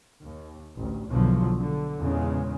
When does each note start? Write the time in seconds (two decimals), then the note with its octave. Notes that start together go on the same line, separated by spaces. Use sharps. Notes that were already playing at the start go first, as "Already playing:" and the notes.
0.23 D#2
0.77 A1 D2
1.08 B1 E2 B2 D3 F3 F#3
1.58 D3
1.99 E2 A#2 C#3 G#3